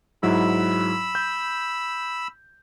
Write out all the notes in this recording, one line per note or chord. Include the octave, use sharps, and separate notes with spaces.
G#2 F#3 E4 B5 E6
G6